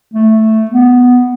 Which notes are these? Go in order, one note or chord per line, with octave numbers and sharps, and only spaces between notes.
A3
B3